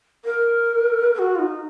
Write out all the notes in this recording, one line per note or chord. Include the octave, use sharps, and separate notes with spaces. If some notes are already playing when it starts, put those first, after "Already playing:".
A#4
A#4
F#4
F4
D#4